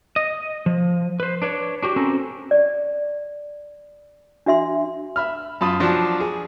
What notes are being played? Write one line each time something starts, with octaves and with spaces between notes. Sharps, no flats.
D#5
F3
B4 C5
D4 B4 C#5
D4 F#4 G4
C4 C#4 F#4 A4 A#4 C5
D5
D4 F#4 E5 C6
E5 B5 F6
F#2 F4 A5 B5 D#6
F3 F#3 D4 F4
G#4